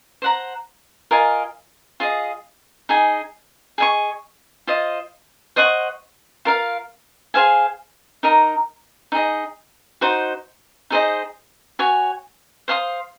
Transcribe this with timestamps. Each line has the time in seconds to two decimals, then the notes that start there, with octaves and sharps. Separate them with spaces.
0.22 C5 F#5 A#5
1.11 F4 A#4 D#5 G#5
2.00 F4 G#4 D#5
2.89 D#4 G#4 D#5 G#5
3.78 G#4 D#5 G#5 C#6
4.67 F4 C5 D#5
5.56 C5 D#5 F#5 C#6
6.45 F4 A#4 F5
7.34 G#4 C5 F5 G#5
8.23 D#4 A#4 D#5 A#5
9.12 D#4 G#4 D#5
10.01 D#4 F#4 C5
10.90 D#4 G#4 C5 D#5
11.79 F#4 C#5 G#5
12.68 C5 F5 C6 D#6